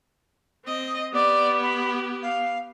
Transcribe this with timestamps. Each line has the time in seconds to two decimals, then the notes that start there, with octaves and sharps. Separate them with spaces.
0.65 C4 D#5
1.13 B3 G4 D5
1.62 B5
2.22 F5